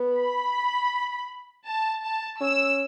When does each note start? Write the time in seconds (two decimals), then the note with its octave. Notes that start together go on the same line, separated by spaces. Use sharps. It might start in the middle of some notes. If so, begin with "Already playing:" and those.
Already playing: B3
0.17 B5
1.67 A5
2.03 A5
2.41 C#4 E6